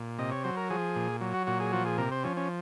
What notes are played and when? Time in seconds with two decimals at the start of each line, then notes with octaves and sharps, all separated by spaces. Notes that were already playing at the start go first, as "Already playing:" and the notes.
Already playing: A#2
0.19 C3 D#5
0.31 C#5
0.44 F#3 C5
0.57 A#4
0.70 F3 G#4
0.96 A#2
1.21 F#3
1.34 F#4
1.47 A#2 F#4
1.60 G#4
1.73 F3 F#4
1.85 G#4
1.98 C3 A#4
2.12 C5
2.24 F3 C#4
2.37 C#4